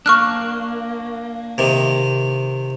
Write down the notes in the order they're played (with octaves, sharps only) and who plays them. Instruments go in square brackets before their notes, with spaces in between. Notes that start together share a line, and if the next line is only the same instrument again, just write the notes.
[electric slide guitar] A#3 D4 [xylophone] C#6 F6 F#6
[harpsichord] C3 D#3